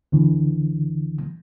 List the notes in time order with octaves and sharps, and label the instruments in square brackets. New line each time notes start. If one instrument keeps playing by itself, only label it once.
[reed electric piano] C#2 D3 E3